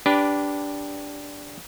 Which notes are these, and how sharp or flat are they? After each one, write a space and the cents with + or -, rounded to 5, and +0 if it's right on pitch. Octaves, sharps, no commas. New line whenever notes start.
D4 -15 G4 +0 B4 +0